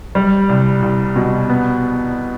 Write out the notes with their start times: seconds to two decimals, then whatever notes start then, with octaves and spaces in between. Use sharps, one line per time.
0.15 G3
0.49 C2
0.82 C2
1.16 B2
1.50 B3